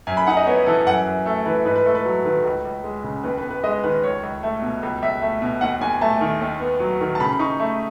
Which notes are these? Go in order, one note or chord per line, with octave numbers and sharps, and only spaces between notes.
F#2 G#5
B5
D#4 F#5
D#5
B3 C#5
E3 A4
F#2 F#5
F#2
A3 A4
E3 B4
G#2 B4
B4
A3 A4
B4
F#3
D#3 B4
C#2
C#2
G#3
C#3
D#2 B4
B4
B3
B4
G#3 D#5
D#3 B4
C#2 C#5
C#2
A3
B2
C#2
C#2 E5
A3
B2
D#2 F#5
D#2 G#5
A3 A5
D#3
D#2
B3
F#3
D#3
A5
C#3 B5
B5
D#4 C#6
A3